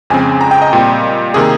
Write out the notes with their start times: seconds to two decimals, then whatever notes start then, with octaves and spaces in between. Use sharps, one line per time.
0.10 F2 C#3 G#3 C4 G#5
0.41 A#5
0.51 G5
0.62 D#5
0.73 A#2 G3 C4
1.34 C3 D#3 A#3 G#4